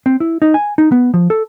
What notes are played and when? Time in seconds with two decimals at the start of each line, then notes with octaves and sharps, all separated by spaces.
0.06 C4
0.20 E4
0.42 D#4
0.54 G#5
0.78 D#4
0.92 B3
1.14 F3
1.30 A4